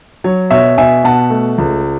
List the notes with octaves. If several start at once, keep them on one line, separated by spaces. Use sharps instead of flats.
F#3 C#5
B2 C#5 E5
B2 E5 G#5
B2 F#5 A5
A3
C#2